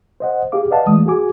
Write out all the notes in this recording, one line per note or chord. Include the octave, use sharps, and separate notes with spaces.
C5 D#5 F#5
G4 G#4 F5 D6
B4 D5 D#5 F5 F#5 A5
E3 G#3 A3 D#6
F#4 G#4 G#5 D6